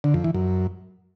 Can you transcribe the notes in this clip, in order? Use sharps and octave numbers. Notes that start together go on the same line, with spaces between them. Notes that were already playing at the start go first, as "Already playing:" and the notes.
D3
F2
E3
F#2